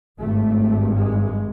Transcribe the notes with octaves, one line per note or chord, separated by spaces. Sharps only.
G#1 G2 A3
G#3